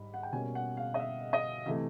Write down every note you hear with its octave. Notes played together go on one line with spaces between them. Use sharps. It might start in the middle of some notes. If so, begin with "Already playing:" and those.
Already playing: G#2 G3 B5
F#5
G5
B2 G3 A#3 C#4 G#5
F#5
F5
D#5
E5
D#5
C3 E3 A3 E5